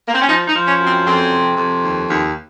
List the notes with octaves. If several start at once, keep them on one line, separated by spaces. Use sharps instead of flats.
A#3
C4
C#4
F3 D#4
D#4
F3
C#4
F#2
C4
F2 C4
C3
F2
D#2
D#2